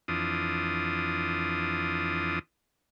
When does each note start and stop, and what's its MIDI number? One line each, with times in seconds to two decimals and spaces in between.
0.08 2.39 41
0.08 2.39 52
0.08 2.39 62
0.08 2.39 65
0.08 2.39 87